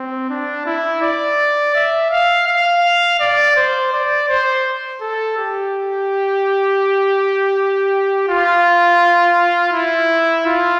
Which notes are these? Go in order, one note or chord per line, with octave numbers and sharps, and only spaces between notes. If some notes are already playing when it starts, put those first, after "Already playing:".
Already playing: C4
D4
E4
D5
E5
F5
F5
D5
C5
D5
C5
A4
G4
F4
E4
F4